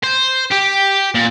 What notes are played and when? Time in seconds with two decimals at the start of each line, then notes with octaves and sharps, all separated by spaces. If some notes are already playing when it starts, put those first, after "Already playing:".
0.04 C5
0.52 G4
1.15 A#2